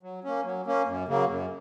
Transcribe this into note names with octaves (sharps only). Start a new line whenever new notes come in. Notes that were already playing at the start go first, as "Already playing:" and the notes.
F#3
A#3 C#4
F#3
A#3 C#4
F#2
C#3 F#3 A#3
F#2